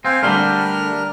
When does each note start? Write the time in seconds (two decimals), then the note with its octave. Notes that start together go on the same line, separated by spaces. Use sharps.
0.05 C4 C5 F5 G#5
0.23 D3 G3 A3 D4 A#4 F6